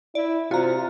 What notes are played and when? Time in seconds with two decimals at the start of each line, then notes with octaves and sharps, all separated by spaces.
0.15 E4 D5
0.51 C3 F4 F#4 A#5